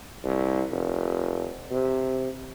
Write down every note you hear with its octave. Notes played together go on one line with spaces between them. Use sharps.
C2
F1
C3